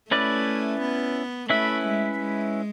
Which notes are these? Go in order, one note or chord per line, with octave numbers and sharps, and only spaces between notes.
A3 C#4 E4 B4 D5
B3
A3 C#4 E4 B4 E5
G#3
G#3